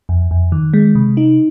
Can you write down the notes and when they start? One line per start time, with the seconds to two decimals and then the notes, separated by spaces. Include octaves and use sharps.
0.09 F2
0.31 F2
0.52 D#3
0.74 G#3
0.95 C3
1.17 D#4